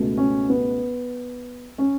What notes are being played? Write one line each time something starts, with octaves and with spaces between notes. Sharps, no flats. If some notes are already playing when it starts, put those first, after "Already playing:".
Already playing: C#2 B2 A3
C#4
B3
C#4